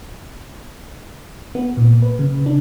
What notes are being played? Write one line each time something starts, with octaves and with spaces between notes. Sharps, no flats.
B3
A#2
B4
C#3
D4